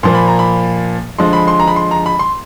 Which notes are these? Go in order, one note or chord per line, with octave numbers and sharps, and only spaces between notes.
A#2 F3 A#3 C6
B5
A#5
B5
D3 F3 G#3 C6
B5
C6
A#5
B5
C6
A#5
B5
C6